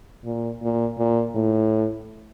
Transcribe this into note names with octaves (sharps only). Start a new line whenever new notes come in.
A#2
A#2
A#2
A2